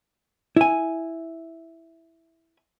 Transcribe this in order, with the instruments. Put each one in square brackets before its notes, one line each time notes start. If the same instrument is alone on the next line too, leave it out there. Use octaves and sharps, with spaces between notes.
[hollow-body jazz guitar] E4 G#5